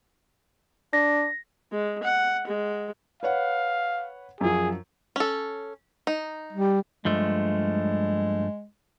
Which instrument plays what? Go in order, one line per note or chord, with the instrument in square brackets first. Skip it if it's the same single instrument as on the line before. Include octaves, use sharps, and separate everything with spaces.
[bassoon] D4 [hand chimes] A#6
[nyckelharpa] G#3
F#5
G#3
[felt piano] B4 C#5 F#5 [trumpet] F5
[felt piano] F#2 F3 [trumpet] G#4
[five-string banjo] C#4 A4
D#4
[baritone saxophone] G3
[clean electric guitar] G2 F3 A3 [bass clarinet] G#3